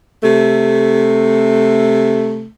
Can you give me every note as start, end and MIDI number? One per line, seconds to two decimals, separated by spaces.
0.23 2.46 48
0.23 2.46 57